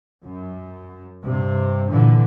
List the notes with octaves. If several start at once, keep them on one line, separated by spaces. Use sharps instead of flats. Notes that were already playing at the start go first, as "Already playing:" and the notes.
F#2
G2 C3
A#2 D3 E3